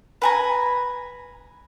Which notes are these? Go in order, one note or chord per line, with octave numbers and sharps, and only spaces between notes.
B4 G#5 A#5